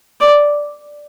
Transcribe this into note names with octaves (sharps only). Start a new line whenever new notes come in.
D5